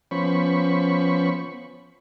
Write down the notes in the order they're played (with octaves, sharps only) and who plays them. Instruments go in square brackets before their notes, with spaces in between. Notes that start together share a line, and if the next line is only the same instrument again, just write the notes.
[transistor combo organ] F3 B3 C#4 C5 B5 C#6